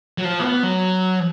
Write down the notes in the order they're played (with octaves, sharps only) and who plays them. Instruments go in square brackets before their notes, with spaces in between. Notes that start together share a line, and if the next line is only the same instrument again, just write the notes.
[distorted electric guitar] F#3
F3
A#3
B3
F#3